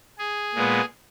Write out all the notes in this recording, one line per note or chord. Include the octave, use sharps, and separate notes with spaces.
G#4
A#2 G#3 B3